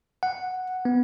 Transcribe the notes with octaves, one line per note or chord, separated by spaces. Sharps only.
F#5
B3